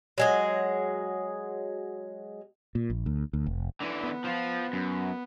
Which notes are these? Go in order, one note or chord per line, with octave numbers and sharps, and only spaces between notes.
F#3 G#3 G#4
A#2
A#1
D2
D2
F1
D3 E3
B3
F3 F4
F#2